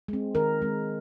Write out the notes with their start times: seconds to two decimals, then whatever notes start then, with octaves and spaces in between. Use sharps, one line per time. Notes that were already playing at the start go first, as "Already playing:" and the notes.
0.08 G#3 C4
0.35 D#3 A#4
0.62 G#3 C4